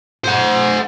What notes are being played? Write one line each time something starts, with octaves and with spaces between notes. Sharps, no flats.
C5 F#5